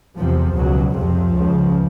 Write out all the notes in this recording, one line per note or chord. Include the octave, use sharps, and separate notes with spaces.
E2 C3 F3
C#2 B2 F#3
F2 C3 F3
C#2 C#3